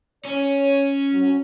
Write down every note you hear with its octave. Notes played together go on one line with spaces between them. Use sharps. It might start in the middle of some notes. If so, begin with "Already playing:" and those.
C#4 C#5
F#3